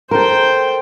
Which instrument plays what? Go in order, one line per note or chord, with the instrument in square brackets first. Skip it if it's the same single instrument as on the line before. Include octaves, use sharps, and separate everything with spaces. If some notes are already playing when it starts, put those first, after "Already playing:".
[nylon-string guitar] A4 A#4 [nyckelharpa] C5 G5